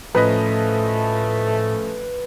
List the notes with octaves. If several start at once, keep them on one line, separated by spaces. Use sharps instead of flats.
A2 F3 A3 C#4 B4 D#5